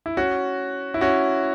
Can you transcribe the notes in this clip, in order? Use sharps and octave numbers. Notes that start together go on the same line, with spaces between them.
E4
C#4 F#4
E4
C#4 F#4